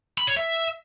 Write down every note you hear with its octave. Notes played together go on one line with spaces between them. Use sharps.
B5
C#5
E5